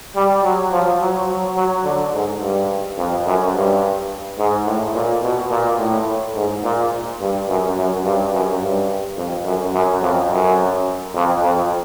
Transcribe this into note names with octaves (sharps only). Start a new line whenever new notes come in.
G3
F#3
F3
F#3
F#3
F#3
D3
G#2
G2
F2
F#2
G2
G#2
A2
A#2
B2
A#2
A2
G#2
A#2
G2
F#2
F#2
G2
F#2
G2
F2
F#2
F#2
F2
F#2
F2
F2